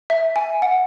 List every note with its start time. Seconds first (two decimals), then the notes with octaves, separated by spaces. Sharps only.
0.10 E5
0.36 G#5
0.62 F#5